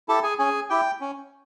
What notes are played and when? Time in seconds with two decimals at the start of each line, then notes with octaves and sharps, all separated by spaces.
0.08 E4 G4 A4 A5
0.23 G#4 G#5
0.38 C#4 G#4 G#5
0.70 E4 G4 G5
1.01 C#4